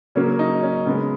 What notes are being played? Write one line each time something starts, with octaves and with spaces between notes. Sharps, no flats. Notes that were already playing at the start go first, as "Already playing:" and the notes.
C#3 F#3 A#3 C#4
D#4
C#4
C#3 G#3 B3